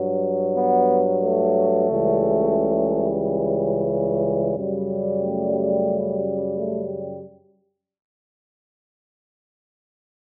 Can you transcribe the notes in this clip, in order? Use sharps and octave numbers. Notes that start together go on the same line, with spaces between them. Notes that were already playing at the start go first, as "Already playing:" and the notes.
Already playing: G2 F#3
B3
A3
C#2 C#3 E3 G3
G3
F#2 C#3 G3
A3
A3